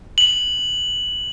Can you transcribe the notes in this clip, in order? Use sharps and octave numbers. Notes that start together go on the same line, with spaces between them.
F#7